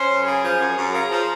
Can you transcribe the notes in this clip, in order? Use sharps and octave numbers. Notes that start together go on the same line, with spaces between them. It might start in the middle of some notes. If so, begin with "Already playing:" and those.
Already playing: C#4 C5 C6
F#2
C#3 G#4 G#5
F3
F#2
F#2
C#3 A#4 A#5
F3